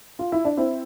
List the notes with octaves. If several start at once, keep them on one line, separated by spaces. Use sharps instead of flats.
F4
E4
D4
C4 E4